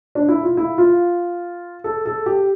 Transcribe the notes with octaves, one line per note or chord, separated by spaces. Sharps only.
D4
E4
F4
E4
F4
A4
A4
G4